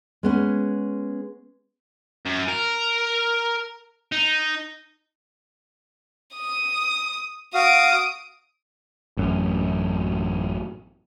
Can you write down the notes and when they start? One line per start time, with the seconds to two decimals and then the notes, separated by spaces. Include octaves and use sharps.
0.23 G#3 B3 C#4
2.25 F#2
2.48 A#4
4.12 D#4
6.35 D#6
7.54 F#4 F5 D#6 D7
9.17 A1 F#2